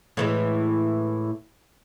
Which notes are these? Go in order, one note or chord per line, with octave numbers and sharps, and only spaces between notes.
A2 E3 G#3